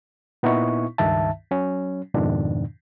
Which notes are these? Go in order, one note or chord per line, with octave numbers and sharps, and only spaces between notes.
A#2 B3 D#4 E4 C#6
C#2 G2 D#3 E5 A5
F#3 C#4
F2 G#2 B2 D#3 D4